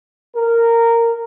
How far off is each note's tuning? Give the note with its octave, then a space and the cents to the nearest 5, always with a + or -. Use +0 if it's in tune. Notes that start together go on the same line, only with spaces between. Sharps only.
A#4 -10